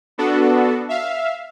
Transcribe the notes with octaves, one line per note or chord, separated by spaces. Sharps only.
B3 D4 F#4 A4
E5 F5